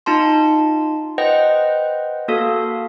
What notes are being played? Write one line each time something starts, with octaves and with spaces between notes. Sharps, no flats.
D#4 F4 A5 C6
B4 C5 D#5 F#5 G5 A#6
A#3 F#4 A4 F5